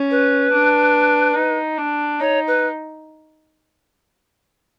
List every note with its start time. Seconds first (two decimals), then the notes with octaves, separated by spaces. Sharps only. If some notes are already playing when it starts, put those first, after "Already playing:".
Already playing: C#4
0.11 B4
0.52 D4
1.36 D#4
1.78 D4
2.20 D#4 C#5
2.47 B4